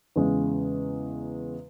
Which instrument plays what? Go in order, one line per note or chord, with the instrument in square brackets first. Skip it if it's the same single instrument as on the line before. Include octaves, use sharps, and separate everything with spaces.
[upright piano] E2 C#3 G#3